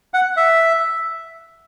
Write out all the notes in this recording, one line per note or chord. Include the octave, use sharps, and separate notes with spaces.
F#5
E5